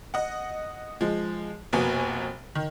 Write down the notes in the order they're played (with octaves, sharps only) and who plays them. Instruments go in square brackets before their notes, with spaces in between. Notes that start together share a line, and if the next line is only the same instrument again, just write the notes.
[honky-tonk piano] D#5 F#5
F3 G#3
F1 B2 A#3 B3 G#5
D#3